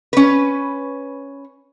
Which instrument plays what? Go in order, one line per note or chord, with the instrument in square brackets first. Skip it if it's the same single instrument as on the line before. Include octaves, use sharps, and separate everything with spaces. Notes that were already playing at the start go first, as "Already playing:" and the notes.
[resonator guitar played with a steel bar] C#4 B4